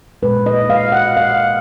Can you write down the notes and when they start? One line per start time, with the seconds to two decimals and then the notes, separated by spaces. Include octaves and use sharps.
0.22 A#2 G#3 B4
0.46 D#5
0.70 F5
0.92 F#5
1.17 F5